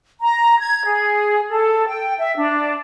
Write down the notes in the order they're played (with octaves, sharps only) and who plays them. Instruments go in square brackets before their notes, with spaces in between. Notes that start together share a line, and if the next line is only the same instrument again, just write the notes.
[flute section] A#5
G#6
G#4
A4
G5
E5
D4